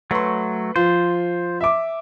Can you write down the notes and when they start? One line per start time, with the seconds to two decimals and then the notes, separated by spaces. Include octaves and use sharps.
0.11 F#3 A3 B4 C6
0.76 F3 F4 C5
1.61 E5 D6